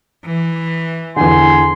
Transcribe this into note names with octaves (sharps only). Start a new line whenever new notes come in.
E3
E2 D3 G#5 C6